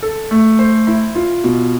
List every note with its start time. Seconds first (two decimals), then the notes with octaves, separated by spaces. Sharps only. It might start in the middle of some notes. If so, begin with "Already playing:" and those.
0.03 A4
0.31 A3
0.59 C5
0.87 E4
1.15 F4
1.44 B2